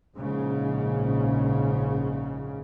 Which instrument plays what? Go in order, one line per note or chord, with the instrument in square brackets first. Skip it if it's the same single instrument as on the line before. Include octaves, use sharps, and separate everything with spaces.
[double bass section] A#1 G#2 C#3